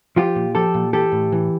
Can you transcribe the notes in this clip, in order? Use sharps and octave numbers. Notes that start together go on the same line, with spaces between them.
F3 F4 G4
A#2
F3 G4 A4
A#2
E3 G4 A4
A2
E3